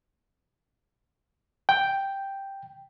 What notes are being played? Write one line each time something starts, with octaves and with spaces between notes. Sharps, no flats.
G5